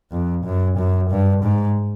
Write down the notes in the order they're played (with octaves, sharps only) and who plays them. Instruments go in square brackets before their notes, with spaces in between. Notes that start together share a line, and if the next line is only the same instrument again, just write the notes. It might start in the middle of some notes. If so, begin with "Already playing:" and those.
[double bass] F2
F#2
F#2
G2
G#2